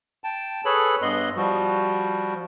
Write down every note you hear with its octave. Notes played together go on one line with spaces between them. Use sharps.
G5 A5
G#4 A4 B4 C#5 B5
G2 B3 D#5 C6 F#6
F3 G3 F#4